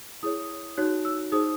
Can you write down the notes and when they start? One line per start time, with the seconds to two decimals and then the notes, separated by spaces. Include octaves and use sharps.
0.23 E4 G#4 C#5 D#6
0.77 D#4 F#4 C#5 F#6
1.05 E6
1.32 D#4 G#4 C5 D#6